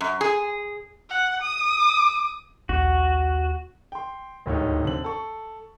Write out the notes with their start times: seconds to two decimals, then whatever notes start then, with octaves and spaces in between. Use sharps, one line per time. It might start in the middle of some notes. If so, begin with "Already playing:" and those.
0.01 F#2
0.21 G#4
1.09 F#5
1.42 D#6
2.69 A#1 D#2 F#4
3.92 G5 C6
4.46 D1 D#2 G#2 D#4 C#5
4.85 D3 C4 F#7
5.04 A4 C#6